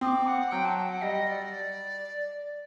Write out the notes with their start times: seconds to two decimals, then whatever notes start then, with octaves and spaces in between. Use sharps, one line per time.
0.01 C4 D#6
0.06 D6
0.27 F#5
0.51 F#3 G5
0.65 A5
0.77 G5
0.90 F#5
1.02 G3 D#5
1.28 D5